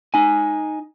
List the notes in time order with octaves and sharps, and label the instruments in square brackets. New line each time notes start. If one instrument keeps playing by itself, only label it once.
[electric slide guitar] D#4 G#5